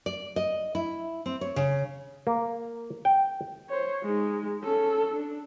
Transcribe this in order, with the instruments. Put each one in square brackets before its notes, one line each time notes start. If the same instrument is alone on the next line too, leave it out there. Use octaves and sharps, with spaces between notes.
[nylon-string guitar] D5
D#5
E4
C4
C#5
C#3
[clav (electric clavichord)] A#3
G5
[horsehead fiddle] C5 C#5
G#3 D#4
C#4 A4
D4